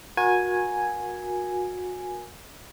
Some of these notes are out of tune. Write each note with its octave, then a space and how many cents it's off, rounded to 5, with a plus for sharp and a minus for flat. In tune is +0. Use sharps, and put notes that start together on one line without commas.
F#4 -30 A#4 +25 G#5 +0